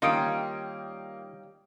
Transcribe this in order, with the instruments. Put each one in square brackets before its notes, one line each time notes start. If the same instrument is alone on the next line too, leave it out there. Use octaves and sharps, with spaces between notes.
[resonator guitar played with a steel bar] D#3 G3 C#4 [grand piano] A#3 D#6 D7 [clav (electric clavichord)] D#4 F4